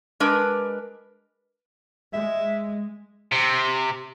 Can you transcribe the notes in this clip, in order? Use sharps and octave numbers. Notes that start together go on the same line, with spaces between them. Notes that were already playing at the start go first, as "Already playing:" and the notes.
G#3 D4 A#4 B4
G#3 E5
C3